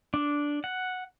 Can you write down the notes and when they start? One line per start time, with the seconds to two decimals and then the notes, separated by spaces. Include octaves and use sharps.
0.14 D4
0.64 F#5